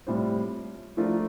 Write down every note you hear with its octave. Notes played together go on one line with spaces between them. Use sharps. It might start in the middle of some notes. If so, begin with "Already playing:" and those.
A2 G3 C4 F4 C5
F3 A3 D4 F4 A#4